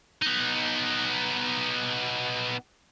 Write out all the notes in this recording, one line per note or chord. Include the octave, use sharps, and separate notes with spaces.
B3 D#4